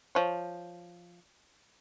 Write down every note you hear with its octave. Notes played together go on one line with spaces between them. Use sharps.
F3 C#5